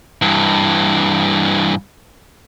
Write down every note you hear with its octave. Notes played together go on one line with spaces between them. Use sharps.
G2 E3